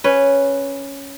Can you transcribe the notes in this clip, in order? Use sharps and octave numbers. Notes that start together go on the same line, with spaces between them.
C#4 B4